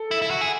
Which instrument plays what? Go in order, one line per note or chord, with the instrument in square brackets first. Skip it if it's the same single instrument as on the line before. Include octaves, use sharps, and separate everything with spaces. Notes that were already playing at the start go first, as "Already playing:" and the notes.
Already playing: [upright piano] A4
[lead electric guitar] E4
E4
F#4
G#4